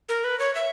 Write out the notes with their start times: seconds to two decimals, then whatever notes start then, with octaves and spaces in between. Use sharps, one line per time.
0.09 A#4
0.24 B4
0.39 C#5
0.55 E5